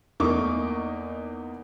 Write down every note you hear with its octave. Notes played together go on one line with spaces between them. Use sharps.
E2 A3 A#3 D#4 C#6 D6